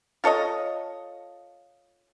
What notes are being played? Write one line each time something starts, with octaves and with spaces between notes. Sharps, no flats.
F4 A4 C#5 D#5